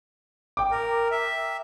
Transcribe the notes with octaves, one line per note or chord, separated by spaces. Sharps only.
G5 D6
A#4
E5